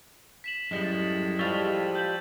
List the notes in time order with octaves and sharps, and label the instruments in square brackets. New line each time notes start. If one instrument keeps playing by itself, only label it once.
[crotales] B6 E7 F#7
[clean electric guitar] F#2 G3 [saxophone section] A2 G#3
[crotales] A6
[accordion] F3 G3 [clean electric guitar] G4 F5 [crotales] C#6 E6 A6
[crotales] G6 F#7